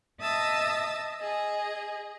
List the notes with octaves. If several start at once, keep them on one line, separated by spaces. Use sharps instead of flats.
D#5 E5 A5 D#6 E6
G#4 D#5